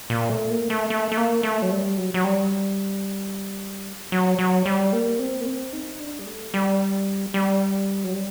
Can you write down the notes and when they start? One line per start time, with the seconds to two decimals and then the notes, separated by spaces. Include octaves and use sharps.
0.10 A#2
0.30 A3
0.50 A#3
0.70 A3
0.90 A3
1.12 A3
1.17 A#3
1.43 A3
1.62 F#3
1.71 G3
1.98 F#3
2.14 F#3
2.24 G3
4.12 F#3
4.39 F#3
4.66 G3
4.93 A#3
5.19 C4
5.41 A#3
5.46 C4
5.73 D#4
6.00 D4
6.19 G3
6.26 A3
6.54 G3
7.34 G3
8.04 F#3
8.14 G3